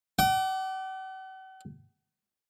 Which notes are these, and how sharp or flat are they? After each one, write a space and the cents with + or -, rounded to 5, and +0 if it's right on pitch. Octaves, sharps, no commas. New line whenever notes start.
F#5 +45 D6 +0